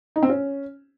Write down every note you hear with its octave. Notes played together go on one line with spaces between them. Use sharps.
D#4
C4
C#4